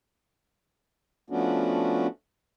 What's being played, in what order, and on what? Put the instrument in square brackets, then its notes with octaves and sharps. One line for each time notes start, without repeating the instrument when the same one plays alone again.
[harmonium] F3 A3 B3 C#4 D4 F#4